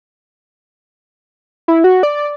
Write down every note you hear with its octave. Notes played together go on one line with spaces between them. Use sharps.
E4
F#4
D5